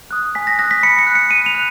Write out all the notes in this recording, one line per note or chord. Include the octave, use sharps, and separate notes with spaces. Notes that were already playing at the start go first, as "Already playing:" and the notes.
D#6 F#6
G#5 B6
A#6
D#6 F#6 A#6
B6
B5 C#7
C#7
F#6
C#7
B5 D#7
F7
F#6